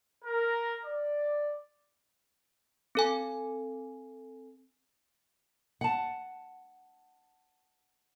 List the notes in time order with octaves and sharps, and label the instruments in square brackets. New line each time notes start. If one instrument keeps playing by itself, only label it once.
[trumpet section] A#4
D5
[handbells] C4 A4 G#5
[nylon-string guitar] F#5 A5